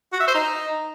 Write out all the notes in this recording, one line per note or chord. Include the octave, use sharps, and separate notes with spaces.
F#4
E5
C5
D#4